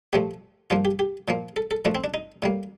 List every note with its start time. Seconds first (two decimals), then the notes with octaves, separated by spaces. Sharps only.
0.13 A#2 F3 A3 G4
0.70 G2 F3 A#3 F4
0.85 G4
0.99 G4
1.28 A#2 F3 A#3
1.56 A4
1.71 A4
1.85 A#2 F3 A3 D4
1.95 C4
2.04 D4
2.14 D#4
2.42 A2 G3 A#3